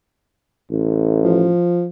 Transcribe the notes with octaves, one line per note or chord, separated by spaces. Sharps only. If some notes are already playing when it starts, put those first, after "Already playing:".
A1
F3